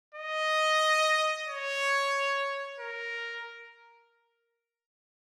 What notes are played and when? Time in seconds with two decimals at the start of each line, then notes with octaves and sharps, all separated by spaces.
0.15 D#5
1.48 C#5
2.80 A#4